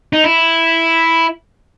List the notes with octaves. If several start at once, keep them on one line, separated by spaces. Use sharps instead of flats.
D#4
E4